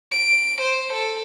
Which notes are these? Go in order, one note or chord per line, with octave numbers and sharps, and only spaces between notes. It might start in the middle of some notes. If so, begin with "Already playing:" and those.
D7
C5
A4